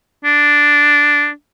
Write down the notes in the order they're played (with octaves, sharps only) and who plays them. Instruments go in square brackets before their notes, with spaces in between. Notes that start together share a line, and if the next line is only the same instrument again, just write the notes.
[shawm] D4